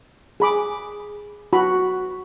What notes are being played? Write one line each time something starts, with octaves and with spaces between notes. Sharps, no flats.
G#4 B5 D6
F#4 B5